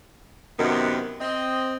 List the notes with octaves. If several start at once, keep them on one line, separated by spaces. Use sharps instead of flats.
F#2 C3 D#3 B3
C4 D#5